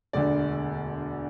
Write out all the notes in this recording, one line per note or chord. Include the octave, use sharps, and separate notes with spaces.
E1 D2 D3 D5